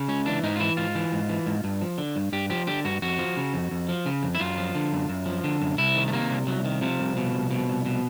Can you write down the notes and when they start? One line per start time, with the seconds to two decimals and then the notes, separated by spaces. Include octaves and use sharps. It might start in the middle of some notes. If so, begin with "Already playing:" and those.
Already playing: C#3
0.08 C#2 C#4
0.25 E3 D4
0.43 G#2 D#4
0.56 F4
0.60 E3 E4
0.77 G#2 F4
0.95 E3
1.12 G#2
1.29 E3
1.47 G#2
1.64 G2
1.82 F3
1.98 D3
2.16 G2
2.32 G2 G4
2.50 F3 G4
2.67 D3 G4
2.85 G2 F#4
3.02 F2 F#4
3.19 F3
3.37 C#3
3.54 F2
3.71 F2
3.89 F3
4.06 C#3
4.23 F2
4.35 E4
4.40 F#2 F4
4.58 F3
4.75 D3
4.93 F#2
5.09 F#2
5.26 F3
5.44 D3
5.61 F#2
5.78 C2 E4
5.96 D#3
6.08 A3
6.12 C3 A#3
6.30 C2
6.47 C2 F#3
6.65 D#3
6.81 C3 F3
6.99 C2
7.16 B2
7.34 C2
7.51 B2
7.68 C2
7.86 B2